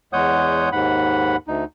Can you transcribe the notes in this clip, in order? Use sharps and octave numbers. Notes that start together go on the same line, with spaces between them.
E2 G#3 C#5 F#5 D#6 G6
D#2 G#2 F#5 B5
D2 D#4